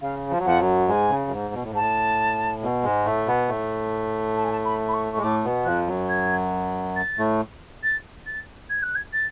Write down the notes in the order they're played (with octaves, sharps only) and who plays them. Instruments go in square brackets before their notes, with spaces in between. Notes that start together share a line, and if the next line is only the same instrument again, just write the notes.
[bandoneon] C#3 [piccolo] F5
[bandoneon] F3
F#3
[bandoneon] F2 F3 [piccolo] F#5
[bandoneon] F#2 F#3
[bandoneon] G#2 G#3 [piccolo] G#5
[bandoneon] C#3
F#2
G#2
B2
A2
G#2
[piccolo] A5
[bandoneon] A2
B2
G#2 G#3
A2 A3
B2 B3
A2 A3
[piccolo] A5
G#5
A5
B5
B5
C#6
[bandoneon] G#3 [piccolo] C#6
[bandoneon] A2 A3 [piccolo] D6
[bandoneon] B2 B3
[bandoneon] F2 F3 [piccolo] F#6
[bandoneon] F#2 F#3
[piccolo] G#6
A6
[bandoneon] A2 A3
[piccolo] A6
A6
G#6
F#6
G#6
A6